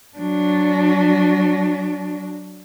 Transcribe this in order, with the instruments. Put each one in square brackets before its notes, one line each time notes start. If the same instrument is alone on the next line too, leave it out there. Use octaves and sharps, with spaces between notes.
[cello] F#3 D4